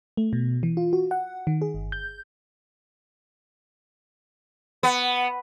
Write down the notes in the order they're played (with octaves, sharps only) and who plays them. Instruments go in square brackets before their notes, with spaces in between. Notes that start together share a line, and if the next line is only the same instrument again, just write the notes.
[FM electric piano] A3
B2
E3
F4
F#4
F#5
D#3
G#4
G1
G6
[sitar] B3